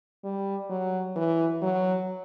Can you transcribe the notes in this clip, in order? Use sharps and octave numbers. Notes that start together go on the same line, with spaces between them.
G3
F#3
E3
F#3